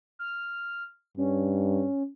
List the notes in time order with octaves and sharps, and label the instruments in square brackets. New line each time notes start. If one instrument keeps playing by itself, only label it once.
[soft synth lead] F6
[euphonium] G2 [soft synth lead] C#4